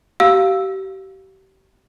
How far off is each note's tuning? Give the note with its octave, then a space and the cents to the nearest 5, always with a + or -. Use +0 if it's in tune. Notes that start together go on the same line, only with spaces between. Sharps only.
G4 -35 F5 +0 E6 +0